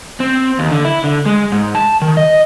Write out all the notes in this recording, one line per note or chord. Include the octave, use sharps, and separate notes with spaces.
C4
D#2
D3
E4
D3
G#3
G#2
A5
D#3
D#5